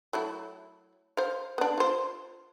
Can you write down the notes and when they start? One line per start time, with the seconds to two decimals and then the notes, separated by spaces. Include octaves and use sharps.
0.13 F#3 A3 E4
1.17 C5 F5
1.58 B3 D4
1.78 F4 C5